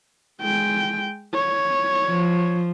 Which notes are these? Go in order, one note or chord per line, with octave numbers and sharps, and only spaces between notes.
G#3 G5
C#5
F3